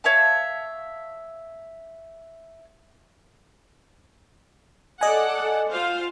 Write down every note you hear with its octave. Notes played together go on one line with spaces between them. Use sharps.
C#5 E5 F5 A5
A4 D5 D#5 F#5 G#5
F4 C5 F5